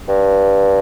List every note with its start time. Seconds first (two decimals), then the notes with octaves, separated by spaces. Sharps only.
0.08 G2